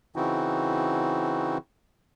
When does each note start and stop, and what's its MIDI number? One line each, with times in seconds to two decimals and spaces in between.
0.16 1.58 49
0.16 1.58 52
0.16 1.58 60
0.16 1.58 63
0.16 1.58 64
0.16 1.58 66